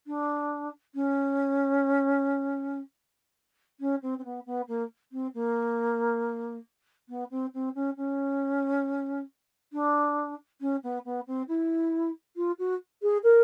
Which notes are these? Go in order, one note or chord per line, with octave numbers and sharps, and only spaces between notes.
D4
C#4
C#4
C4
C4
B3
B3
A#3
C4
A#3
B3
C4
C4
C#4
C#4
D4
C#4
B3
B3
C4
E4
F4
F#4
G#4
A#4